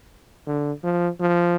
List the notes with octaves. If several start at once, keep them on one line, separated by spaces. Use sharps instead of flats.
D3
F3
F3